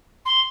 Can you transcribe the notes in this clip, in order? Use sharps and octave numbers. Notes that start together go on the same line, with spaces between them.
C6